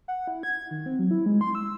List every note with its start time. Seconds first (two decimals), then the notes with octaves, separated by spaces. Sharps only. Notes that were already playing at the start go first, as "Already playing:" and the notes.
0.08 F#5
0.27 E4
0.43 G#6
0.71 D#3
0.86 C4
0.99 F#3
1.11 E4
1.26 G#3
1.41 C6
1.55 E6